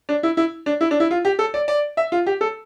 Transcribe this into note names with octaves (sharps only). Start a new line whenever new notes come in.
D4
E4
E4
D4
E4
D4
E4
F4
G4
A4
D5
D5
E5
F4
G4
A4